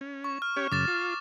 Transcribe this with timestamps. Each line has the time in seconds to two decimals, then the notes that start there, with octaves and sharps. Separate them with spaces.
0.01 C#4
0.24 C#6
0.42 F6
0.56 C#4 G4 C#5
0.72 F#2 C#3 D6 A6 E7
0.88 F4